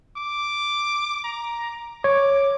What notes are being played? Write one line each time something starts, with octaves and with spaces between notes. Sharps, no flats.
D6
A#5
C#5 D6